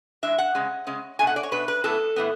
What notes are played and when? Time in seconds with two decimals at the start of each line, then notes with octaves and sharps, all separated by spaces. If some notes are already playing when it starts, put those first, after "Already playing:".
0.23 E3 G#3 D4 E5
0.38 F#5
0.55 C#3 G#3 C#4
0.87 C#3 G#3 C#4
1.19 B2 A3 D4 G#5
1.27 F#5
1.36 D5
1.43 C#5
1.51 B2 A3 D4 B4
1.68 B4
1.84 A2 E3 B3 A4
2.16 A2 E3 B3